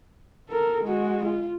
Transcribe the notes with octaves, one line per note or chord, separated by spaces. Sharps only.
A4 A#4
G#3 F#4
F4